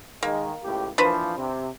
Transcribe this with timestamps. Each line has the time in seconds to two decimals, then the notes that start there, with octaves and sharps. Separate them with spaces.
0.23 D#3 G#3 A#3
0.64 C#2 A2 G4
0.98 E3 F3 A#3 D4 B4 C5
1.37 C3